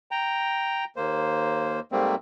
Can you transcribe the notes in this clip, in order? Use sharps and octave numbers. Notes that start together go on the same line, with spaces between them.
G5 A#5
D#2 A#3 C5
G#2 G3 A3 A#3 C4